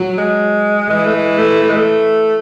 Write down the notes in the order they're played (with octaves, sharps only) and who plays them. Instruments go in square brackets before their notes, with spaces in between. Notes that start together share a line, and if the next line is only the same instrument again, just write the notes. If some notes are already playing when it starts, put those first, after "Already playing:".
Already playing: [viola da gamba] F#3
[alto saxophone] G#3
[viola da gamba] E3 [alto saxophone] G#3
[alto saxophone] A3
G#3
A3
A3
G#3
A3